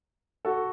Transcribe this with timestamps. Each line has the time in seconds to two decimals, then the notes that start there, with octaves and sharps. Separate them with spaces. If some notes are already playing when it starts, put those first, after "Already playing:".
0.45 F#4 A4